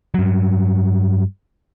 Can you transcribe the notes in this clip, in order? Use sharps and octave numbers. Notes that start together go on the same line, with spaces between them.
G2 F#3